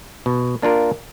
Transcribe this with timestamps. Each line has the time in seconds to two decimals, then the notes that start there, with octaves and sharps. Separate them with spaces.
0.26 B2
0.62 A#3 D4 F4 A#4